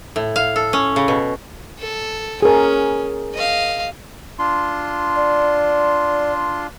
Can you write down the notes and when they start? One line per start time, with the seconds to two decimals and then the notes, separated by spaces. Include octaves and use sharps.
0.16 A2
0.36 F5
0.56 A4
0.73 C#4
0.96 C#3
1.08 B2
1.79 A4
2.42 C#4 G#4 A#4
3.34 D#5 F5
4.39 D4 F4 C6
5.15 D5